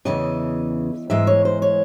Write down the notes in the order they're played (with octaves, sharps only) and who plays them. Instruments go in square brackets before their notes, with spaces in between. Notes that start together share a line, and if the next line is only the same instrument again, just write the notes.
[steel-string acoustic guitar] E2 C#3 E3 D#5
G#2 E3 G#3 E5
C#5
C5
C#5